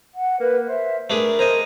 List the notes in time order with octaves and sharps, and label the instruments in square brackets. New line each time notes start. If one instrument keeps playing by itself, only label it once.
[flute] F#5
[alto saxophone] A#3 [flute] B4
[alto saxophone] C5 [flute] E5
[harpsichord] A3 D4 G#4 [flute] A#4 [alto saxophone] B4
[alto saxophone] C5 [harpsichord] D#5 G#5 A#5